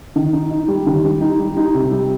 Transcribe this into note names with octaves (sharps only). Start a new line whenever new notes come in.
D#3
D#4
D#4
G3
D#3
G3
D#4
G3
D#4
C3
G3